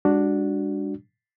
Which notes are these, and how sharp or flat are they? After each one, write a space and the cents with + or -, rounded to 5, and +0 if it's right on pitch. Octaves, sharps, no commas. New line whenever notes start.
G#3 -45 D4 +0 F#4 +5